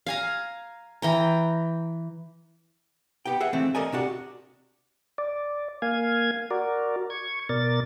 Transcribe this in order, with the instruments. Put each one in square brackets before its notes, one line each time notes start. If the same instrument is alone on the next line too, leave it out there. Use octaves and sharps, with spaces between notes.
[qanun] F5 G#5 A#5
E3 G5 A#5
[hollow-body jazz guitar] B3 G4 G5
G#4 E5 F#5
E3 A3 C4
A4 A#4 D5 D#5 G#5
C3 D4 F#4 D5
[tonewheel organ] D5
A#3 F5 G#5 G#6
F#4 A#4 D5
C#6 G#6
B2 A#4 D5 A6